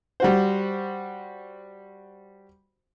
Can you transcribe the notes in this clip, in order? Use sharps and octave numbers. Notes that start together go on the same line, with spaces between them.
G3 F#4 C5